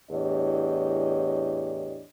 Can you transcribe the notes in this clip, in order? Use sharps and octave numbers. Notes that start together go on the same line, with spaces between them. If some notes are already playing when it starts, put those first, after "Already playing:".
E2 A2 D4 G4 C#5 D#5